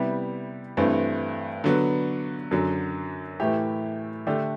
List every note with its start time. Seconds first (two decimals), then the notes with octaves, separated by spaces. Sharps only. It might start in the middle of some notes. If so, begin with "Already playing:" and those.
Already playing: C3 G3 B3 E4 G4
0.77 G2 E3 A3 C4
1.64 D3 F#3 B3
2.51 F#2 D3 F#3
3.40 A2 E3 A3 E4 G4
4.27 D3 A3 D4 G4